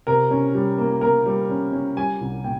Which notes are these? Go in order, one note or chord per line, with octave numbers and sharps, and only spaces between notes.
C3 A#4
C#4
G3
A#3
A#3 A#4
G3
C#4
C#4
G3 G#5
C2
A#2 G5